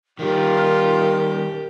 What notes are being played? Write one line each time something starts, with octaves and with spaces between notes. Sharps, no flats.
D#3 G3 D#4 F4 G4 A#4